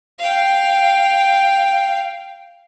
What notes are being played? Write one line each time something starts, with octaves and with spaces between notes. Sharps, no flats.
F5 G5